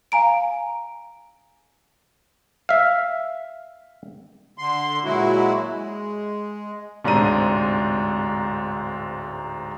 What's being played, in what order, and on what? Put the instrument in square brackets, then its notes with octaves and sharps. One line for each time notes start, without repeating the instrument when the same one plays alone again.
[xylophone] F5 G#5 A#5 D7
[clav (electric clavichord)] E5 F5
[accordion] D3 C6
A#2 F#3 G#3 E4 F#4
G#3
[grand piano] D1 G#2 C3 D4 A#5 D#7